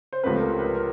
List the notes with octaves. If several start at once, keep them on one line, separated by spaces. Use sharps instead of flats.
C5
C#2 C3 F3 A3 C4 B4
A#4
B4
A#4